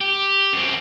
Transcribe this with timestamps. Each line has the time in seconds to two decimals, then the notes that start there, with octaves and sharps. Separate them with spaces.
0.01 G4
0.53 F#2 C4